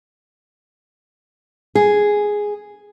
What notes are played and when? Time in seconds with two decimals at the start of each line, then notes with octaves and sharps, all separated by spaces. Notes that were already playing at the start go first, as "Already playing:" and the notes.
1.75 G#4